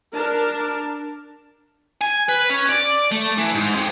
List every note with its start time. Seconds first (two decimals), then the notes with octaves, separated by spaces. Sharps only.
0.15 D4 A#4 A5
2.01 G#5
2.29 B4
2.50 C#4
2.69 D5
3.12 A3
3.38 E3
3.55 G#2
3.75 F2